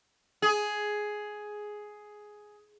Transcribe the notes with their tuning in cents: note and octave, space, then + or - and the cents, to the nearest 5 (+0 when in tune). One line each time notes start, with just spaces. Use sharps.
G#4 +10